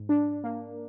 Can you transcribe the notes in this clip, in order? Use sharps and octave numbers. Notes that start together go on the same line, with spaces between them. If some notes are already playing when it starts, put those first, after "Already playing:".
Already playing: G#2
D4
A#3